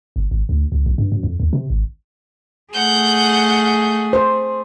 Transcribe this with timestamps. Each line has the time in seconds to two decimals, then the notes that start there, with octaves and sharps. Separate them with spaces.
0.16 G1
0.31 G#1
0.49 D2
0.72 C#2
0.86 B1
0.98 G2
1.12 F#2
1.23 F2
1.40 D#2
1.53 C3
1.70 G#1
2.73 A3 G#4 F#5 G6
4.13 C5